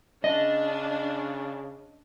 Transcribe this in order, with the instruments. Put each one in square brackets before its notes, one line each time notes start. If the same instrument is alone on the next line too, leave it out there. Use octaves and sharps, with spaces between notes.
[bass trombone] C#3 [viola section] D4 [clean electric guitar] D#5